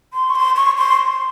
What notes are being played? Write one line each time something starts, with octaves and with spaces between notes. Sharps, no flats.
C6
C#6
C6
C#6
C6